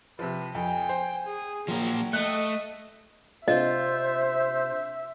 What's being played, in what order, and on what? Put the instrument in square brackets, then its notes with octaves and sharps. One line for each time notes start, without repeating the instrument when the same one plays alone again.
[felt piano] C3 F3 [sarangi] B4
[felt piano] F2 [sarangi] G5 [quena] G#5
[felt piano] C5
[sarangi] G#4
[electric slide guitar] F3 A#3 [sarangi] F#3 [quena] G5
[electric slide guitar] A3 [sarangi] D#5 [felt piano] F#6
[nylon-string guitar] C3 D4 F4 [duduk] C5 [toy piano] D#5 [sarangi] E5